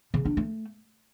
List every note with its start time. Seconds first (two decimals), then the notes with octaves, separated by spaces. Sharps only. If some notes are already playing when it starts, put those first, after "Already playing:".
0.14 C#3
0.25 D4
0.37 A3